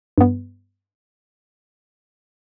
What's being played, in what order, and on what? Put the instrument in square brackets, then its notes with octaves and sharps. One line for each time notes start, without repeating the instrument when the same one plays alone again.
[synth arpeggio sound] G2 B3